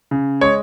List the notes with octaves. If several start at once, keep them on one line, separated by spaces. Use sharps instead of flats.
C#3
G#3 C#5